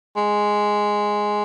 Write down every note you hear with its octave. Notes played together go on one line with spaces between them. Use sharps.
G#3